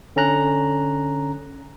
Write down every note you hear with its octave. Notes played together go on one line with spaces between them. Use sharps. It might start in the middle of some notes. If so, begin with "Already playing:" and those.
D3 C#4 A#5 F#6